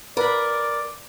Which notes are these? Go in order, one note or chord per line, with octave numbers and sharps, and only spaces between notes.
A#4 B4 D5 B5